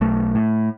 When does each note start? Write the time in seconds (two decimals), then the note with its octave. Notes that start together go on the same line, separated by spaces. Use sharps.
0.01 B1 A3
0.35 A2